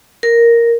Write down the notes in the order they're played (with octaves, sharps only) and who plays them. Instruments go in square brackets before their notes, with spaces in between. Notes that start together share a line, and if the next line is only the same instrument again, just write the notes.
[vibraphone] A#4